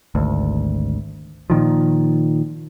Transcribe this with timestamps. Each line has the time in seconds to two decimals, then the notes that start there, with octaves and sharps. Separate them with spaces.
0.15 G#1 D2
1.50 A#2 D#3 F3